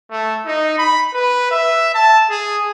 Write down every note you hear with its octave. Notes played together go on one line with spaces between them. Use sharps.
A3
D#4
B5
B4
E5
A5
G#4